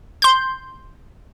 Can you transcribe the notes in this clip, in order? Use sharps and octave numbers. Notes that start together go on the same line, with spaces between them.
C6 G6